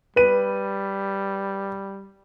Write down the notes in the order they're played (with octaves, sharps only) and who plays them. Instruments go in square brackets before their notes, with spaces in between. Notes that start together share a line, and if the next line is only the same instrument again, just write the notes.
[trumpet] G3 [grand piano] B4 D#7